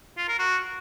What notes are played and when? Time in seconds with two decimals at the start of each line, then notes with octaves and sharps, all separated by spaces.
0.18 F4
0.28 A#4
0.39 F#4